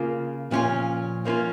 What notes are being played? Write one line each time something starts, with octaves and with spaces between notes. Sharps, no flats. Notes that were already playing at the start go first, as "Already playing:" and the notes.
Already playing: C#3 A#3 F4
A#2 F3 C#4 F4
F3 A#3 C#4 F4